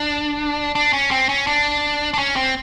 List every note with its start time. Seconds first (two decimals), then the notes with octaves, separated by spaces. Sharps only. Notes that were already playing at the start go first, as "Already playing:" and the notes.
Already playing: D4
0.75 D4
0.93 C#4
1.11 C4
1.29 C#4
1.47 D4
2.14 D4
2.18 C#4
2.36 C4